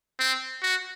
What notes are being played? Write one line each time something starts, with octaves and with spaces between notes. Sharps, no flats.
C4
F#4